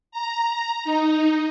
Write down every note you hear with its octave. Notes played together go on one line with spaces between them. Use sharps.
A#5
D#4